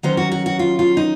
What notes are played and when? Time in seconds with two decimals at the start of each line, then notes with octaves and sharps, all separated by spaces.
0.03 D#3 F#3 C#4 C5
0.17 F#4
0.32 F#4
0.46 F#4
0.59 F4
0.79 F4
0.97 D#4